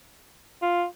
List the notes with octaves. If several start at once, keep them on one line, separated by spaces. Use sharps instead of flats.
F4